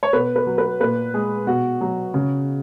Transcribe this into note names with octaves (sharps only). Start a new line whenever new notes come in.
C#5
B2 B4
B4
F#3
B4
A#2 B4
G#3 G#4
B2 F#4
F#3
C#3